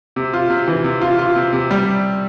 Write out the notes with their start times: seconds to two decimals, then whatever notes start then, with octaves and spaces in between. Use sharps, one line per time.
0.16 C3
0.33 F4
0.50 C3
0.68 E3
0.84 C3
1.02 F4
1.19 F4
1.36 C3
1.53 C3
1.71 G3